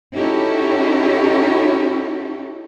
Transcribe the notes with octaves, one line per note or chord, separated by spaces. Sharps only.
C#4 D#4 E4 F#4 G4 A4